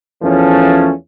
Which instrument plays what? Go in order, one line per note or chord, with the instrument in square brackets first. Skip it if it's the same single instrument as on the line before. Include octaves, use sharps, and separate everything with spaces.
[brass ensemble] E2 F3 A3 C#4